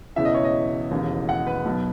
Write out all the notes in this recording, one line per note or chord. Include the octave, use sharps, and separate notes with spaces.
E1 E2 C#3 E3 E5
D#5
C#5
D#5
E1 D#2 C#3 E3
F#5
B4
B1 B2